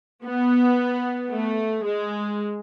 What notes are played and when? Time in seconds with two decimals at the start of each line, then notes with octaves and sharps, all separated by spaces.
0.24 B3
1.30 A3
1.84 G#3